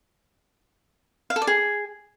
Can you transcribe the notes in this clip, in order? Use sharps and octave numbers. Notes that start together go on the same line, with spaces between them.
F5
A4
D5
G#4